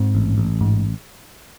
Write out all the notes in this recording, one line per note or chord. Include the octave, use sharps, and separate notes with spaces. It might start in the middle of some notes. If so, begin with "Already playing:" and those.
Already playing: G#2 C4
A1
A1
G#2